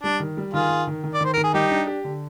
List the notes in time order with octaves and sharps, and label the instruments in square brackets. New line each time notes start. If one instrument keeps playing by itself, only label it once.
[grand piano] G3 [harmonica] D4
[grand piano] D#3
G3
[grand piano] D#3 [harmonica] F4 G#4
[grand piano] D#3
D#3
D#3
[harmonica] D5
[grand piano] D#3 [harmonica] C5
[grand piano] D#3 [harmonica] A#4
[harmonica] G#4
[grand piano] G3 [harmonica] D#4 G4
[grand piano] D4
G4
D3